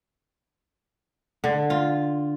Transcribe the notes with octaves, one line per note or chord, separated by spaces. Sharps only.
D3
F4